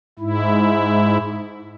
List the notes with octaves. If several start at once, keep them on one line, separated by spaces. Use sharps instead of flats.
G#2 E4